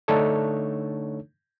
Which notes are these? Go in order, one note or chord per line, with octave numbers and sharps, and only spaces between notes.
D3 A3 D4 D#4 A4 C#5